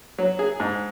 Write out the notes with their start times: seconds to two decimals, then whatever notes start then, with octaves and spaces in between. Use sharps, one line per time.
0.18 F#3
0.39 G#4
0.60 G#2